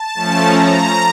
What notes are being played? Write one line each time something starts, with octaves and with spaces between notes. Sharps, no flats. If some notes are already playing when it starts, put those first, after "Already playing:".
Already playing: A5
F3 A3 C#4
A#5